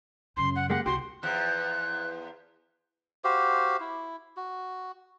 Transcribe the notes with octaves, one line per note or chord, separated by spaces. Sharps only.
F#2 C#3 C6
F#5
G#3 A#3 G4 F#5
C2 F#4 G4 C6
E2 F3 F#6
F#4 G4 C5 F5
E4
F#4